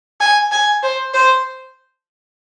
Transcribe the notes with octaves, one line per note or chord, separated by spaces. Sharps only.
G#5
G#5
C5
C5